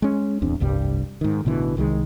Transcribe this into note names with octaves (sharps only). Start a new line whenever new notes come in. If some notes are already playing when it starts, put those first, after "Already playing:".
G#3 C#4
D1 E2 C4 D4
F1 C2 G2 G3
G#2 D#3
A1 B2 D3 E3
C2 D#3 F#3 G#3